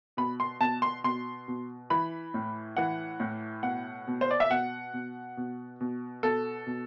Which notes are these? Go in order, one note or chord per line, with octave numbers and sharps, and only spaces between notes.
B2 B5
C6
B2 A5
C6
B2 C6
B2
E3 B5
A2
E3 F#5
A2
B2 F#5
B2
C5
D5
E5
B2 F#5
B2
B2
B2
B2 A4
B2